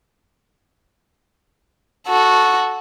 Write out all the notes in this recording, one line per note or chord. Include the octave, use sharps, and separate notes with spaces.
F#4 A4